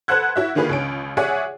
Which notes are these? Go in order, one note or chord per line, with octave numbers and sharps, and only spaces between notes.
A4 B4 C5 F#5 F#6 G#6
E4 F#4 E5
D3 D#3 A#3 F4 G#4 B4
C#2 C#4 D7
G#4 C#5 D5 E5 F#5 G#5